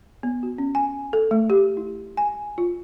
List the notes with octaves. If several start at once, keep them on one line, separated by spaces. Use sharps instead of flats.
B3
F#4
C#4
G#5
A4
A3
G4
E4
G#5
F4